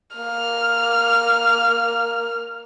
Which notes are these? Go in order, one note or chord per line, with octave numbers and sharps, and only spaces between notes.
A#3 F6